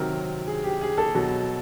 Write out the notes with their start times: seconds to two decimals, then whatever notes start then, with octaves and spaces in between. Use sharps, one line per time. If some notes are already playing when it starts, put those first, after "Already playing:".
Already playing: C3 D#3 F#3 A#4
0.47 G#4
0.64 G4
0.81 G#4
0.98 A4
1.15 B2 F#3